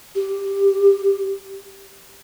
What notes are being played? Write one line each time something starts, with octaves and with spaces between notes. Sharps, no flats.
G4